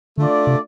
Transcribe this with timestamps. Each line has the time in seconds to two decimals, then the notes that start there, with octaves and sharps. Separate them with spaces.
0.18 D3 A3 D4 F4 D5
0.47 C3